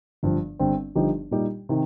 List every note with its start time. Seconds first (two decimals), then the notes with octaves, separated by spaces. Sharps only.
0.23 G1 G2 F3
0.59 G1 G2 G3 C4
0.95 G1 G2 F3 D#4 G4
1.31 A#2 G3 D#4 G4
1.69 C3 D#3